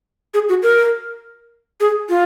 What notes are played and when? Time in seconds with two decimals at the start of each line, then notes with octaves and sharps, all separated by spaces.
0.34 G#4
0.49 F#4
0.63 A#4
1.80 G#4
2.09 F4